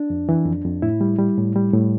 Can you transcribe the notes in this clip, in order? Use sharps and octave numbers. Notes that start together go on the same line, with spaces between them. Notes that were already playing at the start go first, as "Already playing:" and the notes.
Already playing: D4
F2
E3
F2
F2
A2 E4
G3
G3
A2
G3
A2